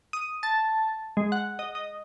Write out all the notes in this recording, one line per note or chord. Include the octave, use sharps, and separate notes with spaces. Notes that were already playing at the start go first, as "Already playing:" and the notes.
D#6
A5
G#3
F#5
D#5
D#5